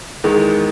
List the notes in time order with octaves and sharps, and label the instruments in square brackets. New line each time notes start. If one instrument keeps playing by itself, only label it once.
[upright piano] E2 D#3 G#3